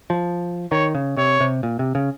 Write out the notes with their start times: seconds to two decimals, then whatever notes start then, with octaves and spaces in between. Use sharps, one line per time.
0.10 F3
0.72 D#3 C#5
0.95 C#3
1.17 C3 C#5
1.40 C3
1.63 A#2
1.79 C3
1.95 C#3